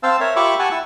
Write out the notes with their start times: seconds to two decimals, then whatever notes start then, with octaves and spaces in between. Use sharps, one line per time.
0.03 C4 C5 F5 A5 E6
0.20 A#4 C#5 E5
0.36 F4 G4 E5 B5 C#6 D6
0.59 G4 F#5 G#5 A5 C#6
0.71 E4 E6